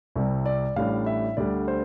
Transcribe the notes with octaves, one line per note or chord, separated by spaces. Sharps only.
C2 C3 G3
D5
A1 A2 G3 D4 F5
E5
D2 D3 G3 D4 D5
C5